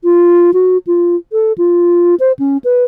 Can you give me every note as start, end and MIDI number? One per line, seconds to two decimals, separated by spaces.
0.04 0.51 65
0.54 0.78 66
0.87 1.16 65
1.32 1.52 69
1.58 2.15 65
2.20 2.32 72
2.39 2.57 61
2.64 2.84 71